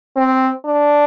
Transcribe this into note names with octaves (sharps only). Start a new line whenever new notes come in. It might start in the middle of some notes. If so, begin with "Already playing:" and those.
C4
D4